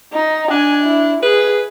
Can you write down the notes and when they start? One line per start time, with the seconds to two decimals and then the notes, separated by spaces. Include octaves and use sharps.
0.13 D#4
0.51 D4 G#5
0.84 E4
1.23 G#4 B4